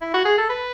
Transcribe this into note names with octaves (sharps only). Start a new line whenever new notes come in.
E4
F#4
G#4
A4
B4